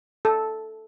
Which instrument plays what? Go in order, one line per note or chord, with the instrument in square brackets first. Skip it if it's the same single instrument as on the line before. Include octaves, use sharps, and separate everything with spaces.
[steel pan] A4